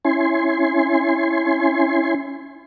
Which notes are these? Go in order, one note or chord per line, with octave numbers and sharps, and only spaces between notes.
C#4 E4 G#5 C6